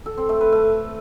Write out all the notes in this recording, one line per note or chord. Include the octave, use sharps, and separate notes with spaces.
A4
C4
A3
B4
A3